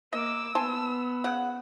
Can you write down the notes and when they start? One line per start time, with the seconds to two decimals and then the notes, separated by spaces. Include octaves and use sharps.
0.13 A#3 D#5 D6 E6
0.55 B3 G#5 A5 C6
1.24 C#3 F#5